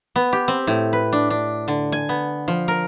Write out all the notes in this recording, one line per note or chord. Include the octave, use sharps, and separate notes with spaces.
B3
G4
C4
A2
B4
D4
D4
D3
G#5
B3
F3
A#4